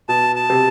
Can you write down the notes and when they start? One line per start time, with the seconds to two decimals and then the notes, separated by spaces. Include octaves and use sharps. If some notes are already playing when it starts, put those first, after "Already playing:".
0.09 B2 A5
0.36 A5
0.50 C3